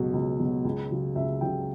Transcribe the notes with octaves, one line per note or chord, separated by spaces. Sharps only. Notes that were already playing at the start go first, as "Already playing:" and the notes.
Already playing: C#2 B2 F#3
C#2
B2 F#3
C#2
C#3 F#3
C#2 E5
C#3 F#3 G5